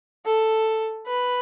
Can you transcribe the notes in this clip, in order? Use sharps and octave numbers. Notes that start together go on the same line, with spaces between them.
A4
B4